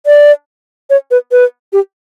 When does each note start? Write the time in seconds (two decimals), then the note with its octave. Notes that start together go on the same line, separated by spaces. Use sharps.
0.06 D5
0.90 C#5
1.11 B4
1.32 B4
1.73 G4